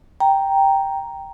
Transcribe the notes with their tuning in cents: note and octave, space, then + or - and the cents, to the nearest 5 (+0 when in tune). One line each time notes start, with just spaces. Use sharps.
G5 +0 A#5 +0